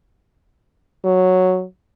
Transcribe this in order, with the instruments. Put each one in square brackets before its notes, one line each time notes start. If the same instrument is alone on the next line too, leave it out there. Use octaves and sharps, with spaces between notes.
[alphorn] F#3